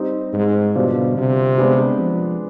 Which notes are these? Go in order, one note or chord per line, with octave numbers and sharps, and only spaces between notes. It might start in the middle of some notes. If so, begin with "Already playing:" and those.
Already playing: G3 C4 D#4
G#2
B2 D3 G3 D4 F4 C5
C3
G#3 B3 D4 G#4 C5
F3